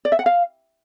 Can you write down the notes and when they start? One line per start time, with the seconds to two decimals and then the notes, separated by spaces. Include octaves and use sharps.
0.05 D5
0.12 E5
0.19 F#5
0.26 F5